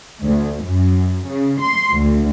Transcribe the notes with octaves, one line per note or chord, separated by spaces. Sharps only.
D2
F#2
C#3
C6
D2